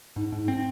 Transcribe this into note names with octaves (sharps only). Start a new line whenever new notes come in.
G#2 D#4
G#2
D#4
C4